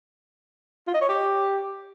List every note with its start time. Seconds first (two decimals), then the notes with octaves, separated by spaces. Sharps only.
0.87 F4
0.94 D#5
1.01 C#5
1.08 G4